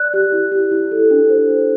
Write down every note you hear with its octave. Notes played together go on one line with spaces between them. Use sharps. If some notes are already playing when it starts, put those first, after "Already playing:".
Already playing: D5 F#6
G4
E4
G4
E4
A4
D4
C5
D4